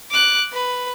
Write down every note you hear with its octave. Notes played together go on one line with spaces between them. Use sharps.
D6 F#6
B4